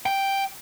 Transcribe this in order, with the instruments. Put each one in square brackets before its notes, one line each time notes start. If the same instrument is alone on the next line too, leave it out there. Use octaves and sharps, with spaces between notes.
[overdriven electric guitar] G5